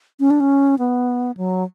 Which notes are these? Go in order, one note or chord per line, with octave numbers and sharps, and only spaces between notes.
C#4
D4
C#4
B3
F#3